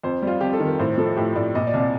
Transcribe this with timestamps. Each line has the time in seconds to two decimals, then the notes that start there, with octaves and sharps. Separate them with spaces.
0.04 F2 C5
0.22 G3 F4
0.41 F2 G4
0.53 A4
0.60 D#3
0.67 A#4
0.79 A2 C5
0.98 F3 A4
1.17 A2 G4
1.35 A2 D5
1.55 A#2 D#5
1.67 D5
1.73 C2
1.80 D5